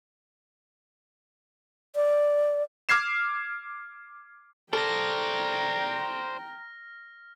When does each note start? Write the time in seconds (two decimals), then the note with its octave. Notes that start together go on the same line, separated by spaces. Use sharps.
1.96 D5
2.89 D6 F6 G#6 C7 E7
4.73 A4 C5 D5 G5 A#5 F6 A#6